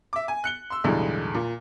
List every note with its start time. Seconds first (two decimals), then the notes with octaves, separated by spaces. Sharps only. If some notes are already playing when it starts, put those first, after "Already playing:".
0.13 E5 D6
0.28 G#5
0.44 F#6 C#7 G7
0.70 C6 E6
0.84 B1 E2 A2 D3 G3 G#3
1.34 A#2